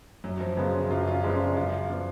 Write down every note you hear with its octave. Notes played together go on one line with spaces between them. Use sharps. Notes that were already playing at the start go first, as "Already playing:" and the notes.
F#2 F#3
F3
C#3 F3 F#3 G#3 B3
C#4
F#2 F4
D4
F4
C#3 F3 G#3 B3 D4
C#4
D4
F#2 F4
F3 B3 D4